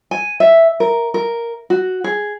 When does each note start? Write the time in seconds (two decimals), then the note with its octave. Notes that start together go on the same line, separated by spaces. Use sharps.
0.11 G#5
0.40 E5
0.80 A#4
1.14 A#4
1.70 F#4
2.04 G#4